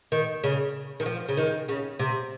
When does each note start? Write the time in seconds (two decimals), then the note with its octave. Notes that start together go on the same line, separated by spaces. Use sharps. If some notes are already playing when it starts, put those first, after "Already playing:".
0.12 D#3
0.44 C#3
1.00 D#3
1.06 F3
1.29 C#3
1.37 D#3
1.69 C#3
1.99 C3